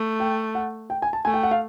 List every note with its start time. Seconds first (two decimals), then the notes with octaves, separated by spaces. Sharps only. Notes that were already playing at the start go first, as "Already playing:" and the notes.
Already playing: A3
0.20 G5
0.55 F#5
0.90 G5
1.02 G#5
1.13 A5
1.25 A3 G#5
1.34 G5
1.43 F#5
1.51 F5